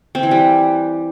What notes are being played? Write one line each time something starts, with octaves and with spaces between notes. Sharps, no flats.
C4
E3
G3